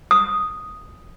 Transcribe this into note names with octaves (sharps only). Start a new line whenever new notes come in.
D#6